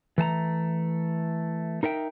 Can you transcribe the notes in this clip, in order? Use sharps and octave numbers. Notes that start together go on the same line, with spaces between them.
E3 A3 A5 A#5
D#4 A#4 E5 G5